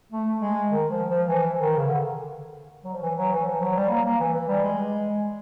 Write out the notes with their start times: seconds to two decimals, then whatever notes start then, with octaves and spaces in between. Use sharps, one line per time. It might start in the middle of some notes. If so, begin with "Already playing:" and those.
0.12 A3
0.41 G#3
0.71 D#3
0.90 F3
1.09 F3
1.28 E3
1.57 D#3
1.77 C#3
1.87 D3
2.84 F#3
2.93 F3
3.03 E3
3.18 F#3
3.32 E3
3.46 F3
3.61 F#3
3.75 G3
3.89 A#3
4.05 A#3
4.20 E3
4.33 E3
4.48 G3
4.63 G#3